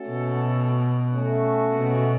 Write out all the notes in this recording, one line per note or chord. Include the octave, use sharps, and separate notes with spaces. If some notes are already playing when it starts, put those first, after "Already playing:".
Already playing: A3 C#4 F#4 A4
B2
A3 C#4 F#4
B2